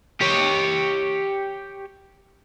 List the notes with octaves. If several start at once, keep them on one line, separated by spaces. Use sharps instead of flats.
G4 C#5